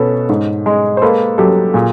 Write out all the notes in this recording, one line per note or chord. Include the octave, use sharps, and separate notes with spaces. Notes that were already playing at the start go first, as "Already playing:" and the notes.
Already playing: B2 C#4 A4 B4
G#2
G#3
C5
A#3 A4 B4
F#3 G4 A4
A#2 G#4